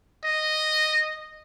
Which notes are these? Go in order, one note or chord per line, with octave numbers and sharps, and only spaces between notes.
D#5